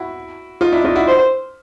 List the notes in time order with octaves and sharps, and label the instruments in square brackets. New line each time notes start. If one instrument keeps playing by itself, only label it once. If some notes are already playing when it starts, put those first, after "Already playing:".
Already playing: [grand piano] E4 F#4
D#4 F4
D4 E4
D#4 F4
E4 F#4
[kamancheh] C5